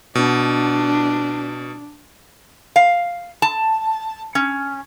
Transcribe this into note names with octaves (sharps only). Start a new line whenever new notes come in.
B2 D4
F5
A5
C#4